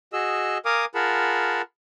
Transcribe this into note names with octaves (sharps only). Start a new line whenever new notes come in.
F#4 G#4 D#5 E6
A#4 F5 G#5 D6 D#6
F4 G#4 A#4 F#5 A5 B5